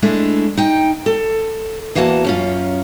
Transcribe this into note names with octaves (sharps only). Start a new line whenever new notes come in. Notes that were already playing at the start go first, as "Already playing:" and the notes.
G#3 A3 D4 E4
D#4 G5
A4
E2 E3 A#3 F#4 D5 A5
F#2 C#4 F4